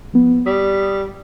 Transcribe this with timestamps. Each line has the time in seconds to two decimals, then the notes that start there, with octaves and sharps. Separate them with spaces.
0.13 F3 B3
0.46 G3 D#6 B6